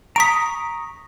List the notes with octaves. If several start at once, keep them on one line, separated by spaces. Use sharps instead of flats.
A#5 C#6 D#6 B6 D7